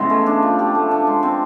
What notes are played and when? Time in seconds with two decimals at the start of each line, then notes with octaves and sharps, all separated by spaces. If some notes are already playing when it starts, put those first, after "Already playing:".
Already playing: C#3 E3 G#3 B3
0.10 A3
0.26 D4
0.42 F3
0.59 G4
0.75 A3
0.91 D4
1.07 G#3
1.23 C4